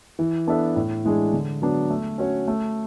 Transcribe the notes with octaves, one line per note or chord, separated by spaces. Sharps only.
E3
B3 D4 A4 E5
A2
E3 G#3 D4 G#4
D3
F#3 B3 D4
A3
C#4 F#4 C#5
A3